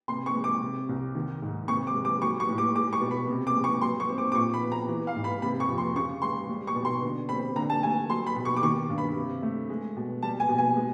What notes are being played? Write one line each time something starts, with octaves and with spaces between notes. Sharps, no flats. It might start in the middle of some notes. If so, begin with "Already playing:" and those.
C3 C6
C#6
G#3
D6
C3
C2
D#3
G#2
C3 C#6
D6
G#3
D6
F#3 C#6
C#6
A2
D6
G#3 D6
C#6
B2
B5
C3
D6
G#3
C#6
F#3 C6
C#6
C4
D6
D6
A#2 C#6
B5
B3
A#5
E3
F5
G#2
B5
C3 B5
C#6
F2
C6
C#3 C#6
G#3 C6
G3
C#6
B2
C6
D3
C4 B5
D3 A#5
A5
A3 G#5
F#3 C6
B5
B2
C#6
D6
D#3 C#6
G2
B5
C3
A3
G#3
B2
G3 A5
G#5
B2
G#5
G#3